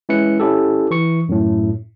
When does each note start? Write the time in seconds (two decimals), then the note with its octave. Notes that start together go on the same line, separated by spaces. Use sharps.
0.09 G#3 C#4 E4 B4 C#7
0.40 C#4 E4 G4 A4
0.91 E3 C#6 C#7
1.29 F#2 A2